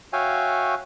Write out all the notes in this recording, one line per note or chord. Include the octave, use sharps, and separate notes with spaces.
F#4 C#5 E5 F5 G5 G#5